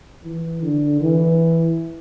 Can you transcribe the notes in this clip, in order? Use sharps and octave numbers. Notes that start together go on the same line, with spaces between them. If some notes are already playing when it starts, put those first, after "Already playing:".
E3
D3
E3